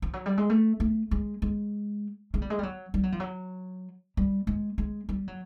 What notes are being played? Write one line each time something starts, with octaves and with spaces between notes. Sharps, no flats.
F3
F#3
G3
G#3
A3
A3
G#3
G#3
G#3
G3
G#3
G3
F#3
G3
F#3
F3
F#3
G3
G#3
G#3
G3
F#3